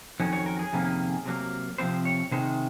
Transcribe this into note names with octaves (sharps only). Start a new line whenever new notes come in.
F2 D#3 F#3 C#4
C#5
A#4
G#4
F2 C3 D#3 A#3 C#4
C3 F#3 A#3
C3 F3 C4 C5
C#5
C3 D#3 G#3 C5